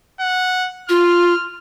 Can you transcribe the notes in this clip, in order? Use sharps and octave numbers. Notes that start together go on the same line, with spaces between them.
F#5
F4 F6